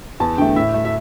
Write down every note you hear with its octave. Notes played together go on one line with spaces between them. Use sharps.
E2 A5
D3 A3 G5
A2 E5
A3
E5